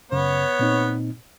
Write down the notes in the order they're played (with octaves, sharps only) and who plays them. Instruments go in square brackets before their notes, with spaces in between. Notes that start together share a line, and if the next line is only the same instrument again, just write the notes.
[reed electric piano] F#2 C#3 [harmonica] B3 C#5
[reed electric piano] A#2 C4 D#4